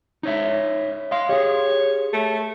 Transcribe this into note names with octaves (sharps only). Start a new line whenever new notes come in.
D#4 C#5 E5
D#5 F5 C6
G4 G#4 C#5
A3